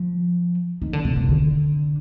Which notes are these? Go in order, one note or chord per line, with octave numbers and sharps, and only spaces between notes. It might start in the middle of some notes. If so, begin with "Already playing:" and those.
Already playing: F3
D#3
D3
C3
C3
D3